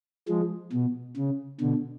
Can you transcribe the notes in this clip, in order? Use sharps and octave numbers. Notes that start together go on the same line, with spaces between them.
F3 G#3
B2
C#3
B2 D3